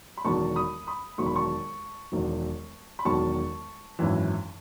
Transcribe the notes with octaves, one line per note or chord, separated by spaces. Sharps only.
B5
E1 E2 D#3 F#3 A5 C#6
B5 D#6
B5 D#6
E1 E2 D#3 F#3 C#6
B5
A5 C#6
E1 E2 D#3 F#3
B5
E1 E2 D#3 F#3 A5 C#6
G#1 F#2 E3